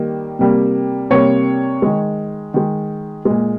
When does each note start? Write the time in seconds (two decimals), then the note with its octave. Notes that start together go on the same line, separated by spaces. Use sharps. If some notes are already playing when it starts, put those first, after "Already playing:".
Already playing: D#3 G3 A#3
0.39 C3 G3 A#3
1.10 C3 G3 A#3 C#5
1.82 D#3 G#3
2.54 D#3 G#3
3.25 A#2 G#3